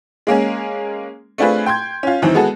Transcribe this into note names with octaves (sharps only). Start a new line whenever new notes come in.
G#3 A#3 C#4 G#4
A3 C4 D4 F4 G#4 B4
G5 C6 G6 G#6
C#4 F4
F#2 D#3 E3 C4 D#4
G#3 B3 F#4 G#4 A4